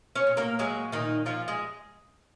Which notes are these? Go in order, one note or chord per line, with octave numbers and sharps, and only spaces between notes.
C#4 C#5
A#2
A#3 A#4
F#3 G#3 G#4
A#2 D#3 D#4
A#2 F3 F4
G#3 G#4